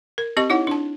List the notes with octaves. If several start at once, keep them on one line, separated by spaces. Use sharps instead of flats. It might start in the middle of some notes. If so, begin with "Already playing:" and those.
A#4
C4 G4 D#5 C#6
D#4 E4 C#5 F#5
D4 A5